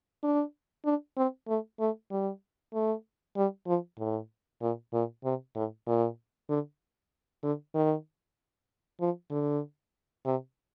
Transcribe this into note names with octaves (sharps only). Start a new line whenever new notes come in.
D4
D4
C4
A3
A3
G3
A3
G3
F3
A2
A#2
A#2
C3
A2
A#2
D3
D3
D#3
F3
D3
C3